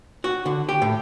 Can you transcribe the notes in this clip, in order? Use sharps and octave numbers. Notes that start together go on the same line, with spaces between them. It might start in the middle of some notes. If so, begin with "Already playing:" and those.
F#4
D3
G4
A2